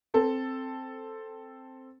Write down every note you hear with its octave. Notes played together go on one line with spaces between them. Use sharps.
C4 A4